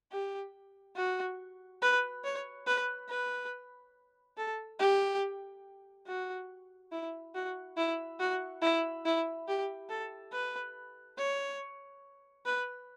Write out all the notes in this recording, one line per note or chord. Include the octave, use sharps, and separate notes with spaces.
G4
F#4
B4
C#5
B4
B4
A4
G4
F#4
E4
F#4
E4
F#4
E4
E4
G4
A4
B4
C#5
B4